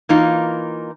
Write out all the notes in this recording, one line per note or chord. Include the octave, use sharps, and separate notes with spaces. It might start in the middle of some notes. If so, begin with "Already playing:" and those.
E3 A#3 D#4 F4